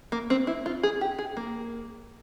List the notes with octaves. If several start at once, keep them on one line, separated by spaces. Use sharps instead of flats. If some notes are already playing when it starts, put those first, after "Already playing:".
A#3
C4
E4
F4
G#4
G4
G#4
A#3